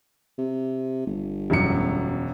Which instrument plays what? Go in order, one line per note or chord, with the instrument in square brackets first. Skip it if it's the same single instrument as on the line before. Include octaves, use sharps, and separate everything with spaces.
[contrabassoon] C3
G1
[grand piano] E1 F#2 C#7